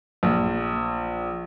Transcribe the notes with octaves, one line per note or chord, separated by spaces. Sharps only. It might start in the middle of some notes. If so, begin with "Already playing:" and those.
A#1